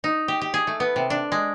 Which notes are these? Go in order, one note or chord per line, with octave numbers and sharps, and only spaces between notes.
D#4
G4
G4
G#4
A3
B3
C3
D4
G#3